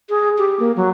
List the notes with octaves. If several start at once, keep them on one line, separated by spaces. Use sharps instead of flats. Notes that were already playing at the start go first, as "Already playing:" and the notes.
G#4
G4
A#3
F#3